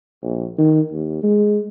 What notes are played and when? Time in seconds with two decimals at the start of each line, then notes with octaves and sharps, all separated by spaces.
0.22 A#1
0.58 D#3
0.92 D#2
1.23 G#3